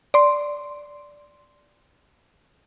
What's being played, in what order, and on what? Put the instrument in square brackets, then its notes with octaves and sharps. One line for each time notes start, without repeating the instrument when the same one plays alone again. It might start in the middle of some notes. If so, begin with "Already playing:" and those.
[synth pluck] D5 C6